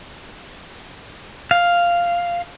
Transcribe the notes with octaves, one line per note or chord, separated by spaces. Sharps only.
F5